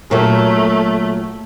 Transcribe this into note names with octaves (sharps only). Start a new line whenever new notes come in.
A#2 F#3 A3